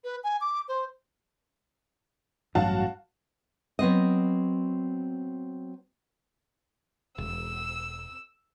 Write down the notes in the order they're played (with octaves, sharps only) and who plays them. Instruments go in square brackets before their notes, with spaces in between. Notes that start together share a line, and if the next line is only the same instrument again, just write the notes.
[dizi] B4
G#5
D6
C5
[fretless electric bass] A1 G2 F#3 [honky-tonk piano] F#4 F5 A5
[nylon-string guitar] F#3 B3 C4 D#5
[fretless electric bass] E1 [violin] E6